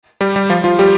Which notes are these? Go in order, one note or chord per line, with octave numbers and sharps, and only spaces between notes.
G3 G4
G3 G4
F3 F4
F3 F4
G3 G4